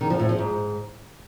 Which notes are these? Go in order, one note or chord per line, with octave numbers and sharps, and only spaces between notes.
D#3
F3
A2
F3
G#2